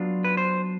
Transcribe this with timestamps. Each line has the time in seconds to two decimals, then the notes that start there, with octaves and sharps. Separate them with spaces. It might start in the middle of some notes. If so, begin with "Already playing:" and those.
Already playing: F#3 B3 D4 F4
0.24 B4
0.37 C5